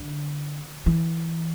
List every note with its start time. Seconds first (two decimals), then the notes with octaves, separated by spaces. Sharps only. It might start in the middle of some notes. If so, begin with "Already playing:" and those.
Already playing: D3
0.86 E3